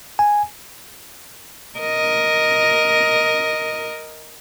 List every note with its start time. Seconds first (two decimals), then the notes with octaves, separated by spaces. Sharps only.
0.19 G#5
1.79 A#4 D#5